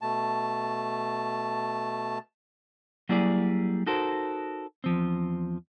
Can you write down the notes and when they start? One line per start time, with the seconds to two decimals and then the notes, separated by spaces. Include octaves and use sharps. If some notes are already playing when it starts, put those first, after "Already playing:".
0.02 B2 A3 A5
3.09 F#3 G3 A#3 E4 G#4 D5
3.86 D#4 F#4 A4 A#4 C5
4.84 E2 F3 C4